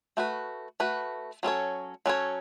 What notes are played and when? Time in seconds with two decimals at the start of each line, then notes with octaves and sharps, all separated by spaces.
0.17 A3 F#4 B4
0.80 A3 F#4 B4
1.43 F#3 C#4 A4 C#5
2.06 F#3 C#4 A4 C#5